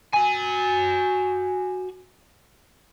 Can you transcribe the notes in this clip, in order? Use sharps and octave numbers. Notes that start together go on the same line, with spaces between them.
F#4 G#5